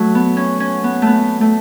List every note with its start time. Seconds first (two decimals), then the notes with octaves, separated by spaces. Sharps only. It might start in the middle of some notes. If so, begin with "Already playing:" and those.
Already playing: F#3 A3
0.15 B3
0.37 C#4
0.60 C#4
0.84 B3
1.02 A3 B3
1.41 A3